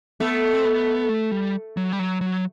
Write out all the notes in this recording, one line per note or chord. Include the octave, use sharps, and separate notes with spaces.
A3 B3
C4
B3
A3
G3
F#3
G3
F#3
F#3